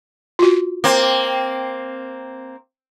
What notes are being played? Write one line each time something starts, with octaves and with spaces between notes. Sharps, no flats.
F4 F#4
A#3 C4